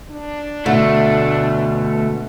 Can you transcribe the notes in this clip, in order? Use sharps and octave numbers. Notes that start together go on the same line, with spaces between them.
D4
D2 B2 A3